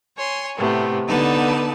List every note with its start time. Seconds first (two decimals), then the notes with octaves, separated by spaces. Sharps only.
0.15 C#5 G#5 C6
0.56 A2 C3 A3 B3
1.07 D3 B3 D#4 B4 A5